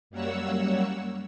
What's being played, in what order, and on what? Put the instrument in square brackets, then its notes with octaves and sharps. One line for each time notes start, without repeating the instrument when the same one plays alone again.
[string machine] F#2 G3 A#3 C#5 F#5 E6